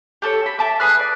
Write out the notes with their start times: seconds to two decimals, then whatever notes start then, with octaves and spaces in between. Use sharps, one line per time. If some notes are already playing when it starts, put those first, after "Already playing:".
0.22 G4 A4 C#5
0.46 B5
0.59 E5 A5 D6
0.80 G#4 B4 F6 F#6
0.99 D5